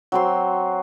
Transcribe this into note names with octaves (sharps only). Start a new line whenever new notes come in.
F#3 C4 C6